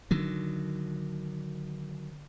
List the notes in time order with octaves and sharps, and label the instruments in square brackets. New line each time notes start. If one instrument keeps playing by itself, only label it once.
[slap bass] D3 D#3 F#3